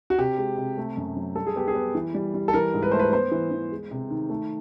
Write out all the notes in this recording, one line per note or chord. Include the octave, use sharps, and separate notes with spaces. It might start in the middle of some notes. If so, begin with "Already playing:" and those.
F#4
C3 G4
G#3
C3
A3
F#2
F#3
G3 A4
G#4
B3 G4
G#4
B3
E3
G3
G3
A4
E3 A#4
G#2
B4
A3 C5
B4
B3 C5
E3
E3
G#3
C3
D#3
A3